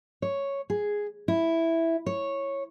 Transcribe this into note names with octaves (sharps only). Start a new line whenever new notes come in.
C#5
G#4
E4
C#5